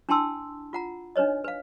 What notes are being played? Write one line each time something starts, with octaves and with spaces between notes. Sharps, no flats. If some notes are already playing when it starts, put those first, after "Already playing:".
D4 E4 G5 A5 C6 E6
F4 F#5 A#5
D4 D#4 B4 C#5 D#5
B4 F5